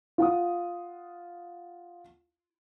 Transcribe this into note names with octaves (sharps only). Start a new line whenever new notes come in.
F4 F#5 D#6